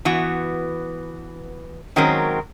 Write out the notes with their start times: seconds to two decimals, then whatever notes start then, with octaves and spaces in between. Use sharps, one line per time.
0.05 E3 B3 F#4
1.96 D#3 F#3 G#3 C4 C#4 A#4